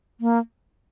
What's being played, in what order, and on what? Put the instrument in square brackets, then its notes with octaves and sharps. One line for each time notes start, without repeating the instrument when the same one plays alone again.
[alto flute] A#3